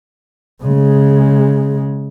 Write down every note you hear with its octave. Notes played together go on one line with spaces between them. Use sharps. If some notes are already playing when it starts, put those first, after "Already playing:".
C#3 G#3